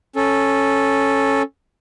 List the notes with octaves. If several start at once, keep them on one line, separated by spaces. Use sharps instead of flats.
C#4 A4